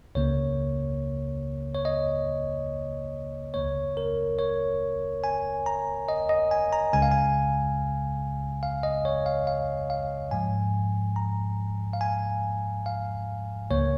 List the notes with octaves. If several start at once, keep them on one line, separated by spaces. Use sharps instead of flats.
C#2 C#3 A#3 C#5
C#5
D#5
C#2 C#3 A#3 C#5
A#4
C#5
G#5
A#5
D#5
D#5
G#5
A#5
C#2 C#3 G#3 G#5
F5
G#5
F5
D#5
C#5
F5
F5
F5
G#2 F3 G#3 G#5
A#5
F5
G#5
F5
C#2 C#3 A#3 C#5